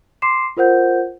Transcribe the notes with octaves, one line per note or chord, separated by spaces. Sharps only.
C6 D6 C7 E7
F4 A#4 C5 F#5 G6